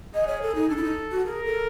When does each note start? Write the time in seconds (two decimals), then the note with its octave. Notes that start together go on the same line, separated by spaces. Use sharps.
0.14 G#4 D#5
0.27 C#5
0.42 A4
0.55 D#4
0.69 D4 A4
0.76 E4
0.84 D#4
1.11 F#4
1.26 G#4 A#4
1.44 A4